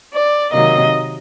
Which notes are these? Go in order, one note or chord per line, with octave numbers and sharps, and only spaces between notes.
D5
C3 D#3 F#3 A#3 D#5